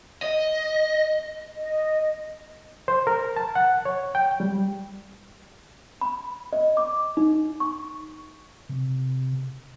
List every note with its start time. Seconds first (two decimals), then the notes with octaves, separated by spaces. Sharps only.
0.22 D#5
1.57 D#5
2.88 C5
3.07 A#4
3.36 A5
3.55 F#5
3.85 C#5
4.15 G5
4.40 G3
6.01 B5
6.53 D#5
6.77 D6
7.17 D#4
7.60 C#6
8.69 C3